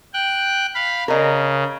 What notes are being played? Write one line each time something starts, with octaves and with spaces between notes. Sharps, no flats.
G5 F#6
F5 B5
C#3 A#4 D#5